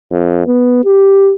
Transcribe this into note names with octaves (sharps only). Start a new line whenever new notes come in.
F2
B3
G4